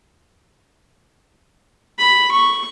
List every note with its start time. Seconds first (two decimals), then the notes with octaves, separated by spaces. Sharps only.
1.99 B5
2.32 C#6